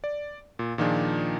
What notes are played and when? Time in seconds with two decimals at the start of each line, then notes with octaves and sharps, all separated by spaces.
0.04 D5
0.59 A#2
0.78 A#2 D#3 F3 D4 G#4